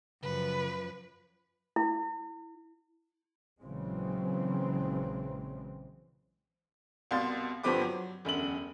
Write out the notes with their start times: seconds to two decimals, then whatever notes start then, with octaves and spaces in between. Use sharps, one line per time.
0.23 F#2 C#3 F3 B4
1.76 E4
3.61 A#1 C#3 E3 F#3 G#3 C4
7.11 C2 B2 F5 C6 A6
7.63 G2 D3 F3 C4 B4 D6
7.81 F#3
8.25 E1 F#2 D3 F#7